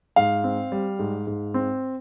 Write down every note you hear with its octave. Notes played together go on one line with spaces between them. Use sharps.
G#2 F5
C4
G3
G#2
G#2
C4